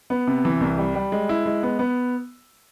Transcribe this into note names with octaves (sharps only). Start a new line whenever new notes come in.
B3
C3
E3
C2
G3
G3
G#3
E4
G#3
B3
B3